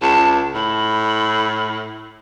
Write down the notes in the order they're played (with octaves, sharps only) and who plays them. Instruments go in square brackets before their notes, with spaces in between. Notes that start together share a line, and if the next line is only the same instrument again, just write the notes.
[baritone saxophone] C#2 [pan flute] A5
[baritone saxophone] A2 [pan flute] B5